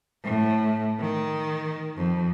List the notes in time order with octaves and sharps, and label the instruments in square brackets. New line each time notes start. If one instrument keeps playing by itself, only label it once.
[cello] A2
D#3
F2